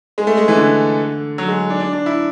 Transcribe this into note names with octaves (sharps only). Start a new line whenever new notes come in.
G#3
A3
G#3
E3
D3
F#3
G#3
D4
D4
D4
E4